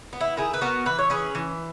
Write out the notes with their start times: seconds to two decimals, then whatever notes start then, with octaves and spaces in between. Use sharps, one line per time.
0.13 B3
0.21 E4
0.37 D#3 E4 G#4
0.54 B4
0.61 B3 F#4 A#4
0.86 E3 B4
0.99 C#5
1.10 C#4 G#4 B4
1.35 E3